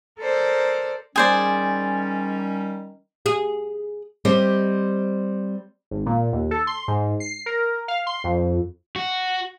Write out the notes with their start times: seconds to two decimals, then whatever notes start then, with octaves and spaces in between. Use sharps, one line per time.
0.19 A4 A#4 C5 D5
1.16 D#3 G3 C#4 G#4 C5 D5
3.26 G#4
4.25 G3 C4 G4 C5 D#5
5.91 G#1
6.06 A#2
6.33 D#2
6.51 A4
6.67 C6
6.88 G#2
7.20 C7
7.46 A#4
7.88 F5
8.07 C6
8.24 F2
8.96 F#4